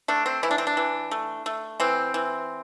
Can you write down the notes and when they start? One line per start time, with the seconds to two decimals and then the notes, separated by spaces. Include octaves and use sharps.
0.08 A3 D4
0.26 C4
0.43 E3 E4
0.51 D4
0.58 C4
0.67 D4
0.77 E3
1.11 A3
1.46 A3
1.80 E3 C4
2.14 E3